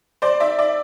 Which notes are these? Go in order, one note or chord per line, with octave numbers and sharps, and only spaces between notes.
C5 D5
D5 E5
D5 E5